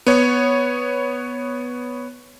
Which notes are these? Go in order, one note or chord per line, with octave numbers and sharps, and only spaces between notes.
B3 C#5